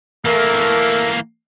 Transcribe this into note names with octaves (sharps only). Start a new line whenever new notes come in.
E3 A3 A#3 A#4